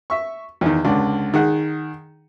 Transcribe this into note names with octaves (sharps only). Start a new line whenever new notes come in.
E5 C#6
E2 D#3
C#2 D3 D4
D#3 G#4 F#5